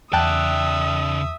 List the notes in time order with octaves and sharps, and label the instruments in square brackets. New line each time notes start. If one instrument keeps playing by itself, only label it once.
[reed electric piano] E2 [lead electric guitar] C#3 D5 [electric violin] E5 D#6 [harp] G5 A5 F#6